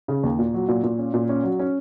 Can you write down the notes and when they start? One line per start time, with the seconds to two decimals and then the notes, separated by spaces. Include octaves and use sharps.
0.08 C#3
0.23 D#2
0.39 A#2
0.54 F#3
0.68 A#2
0.83 A#2
0.98 C#4
1.14 A#2
1.29 C#4
1.44 F#3
1.59 C#4